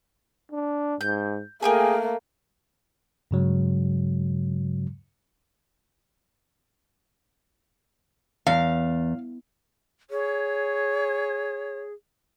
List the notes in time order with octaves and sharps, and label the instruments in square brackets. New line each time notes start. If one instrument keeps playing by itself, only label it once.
[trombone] D4
[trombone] G#2 [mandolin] G6
[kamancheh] A3 A#3 [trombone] G#4 [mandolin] A#4 G5 G#5
[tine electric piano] G2 C#3 F#3 G#3
[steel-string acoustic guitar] E2 [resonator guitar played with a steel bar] F5
[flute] G#4 [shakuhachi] C#5